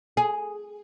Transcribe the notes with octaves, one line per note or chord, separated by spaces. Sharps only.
G#4